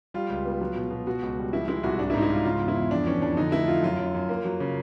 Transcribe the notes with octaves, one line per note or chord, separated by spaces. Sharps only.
G3 F4
C#2
B3
F#3
B2
B2
B2 F#4
C#2
G3
F3 E4
G#3 E4
C2 F#4
G#2 D4
E4
G#2 D#4
E4
G#2 F4
C#3 F4
E2
E4
E2
F2 D4
E3 C#4
F2 D4
D3 D#4
A3 E4
F3 F4
F#2 F4
F#2
F#2
A#3
F#3
C#3